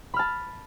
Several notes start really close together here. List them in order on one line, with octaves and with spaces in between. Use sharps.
B5 F6 A5